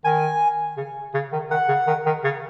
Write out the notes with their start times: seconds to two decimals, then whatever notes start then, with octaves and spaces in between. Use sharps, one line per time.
0.04 D#3 G#5
0.77 C#3
1.14 C#3
1.33 D#3
1.50 D#3 F#5
1.69 C#3
1.87 D#3
2.06 D#3
2.24 C#3